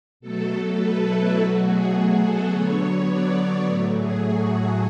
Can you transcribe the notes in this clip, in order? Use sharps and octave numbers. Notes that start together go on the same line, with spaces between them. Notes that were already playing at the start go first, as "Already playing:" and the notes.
B2 F#3 A3 A4
A4
B4
E4
B2 F#3 A3 F#4
G#4
G#4
A4
D3 F#3 B3 C#5
D5
A2 F#3 A3
G#4
F#4